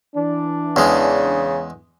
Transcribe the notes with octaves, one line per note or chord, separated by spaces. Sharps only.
E3 D4
E2 C#3 G#3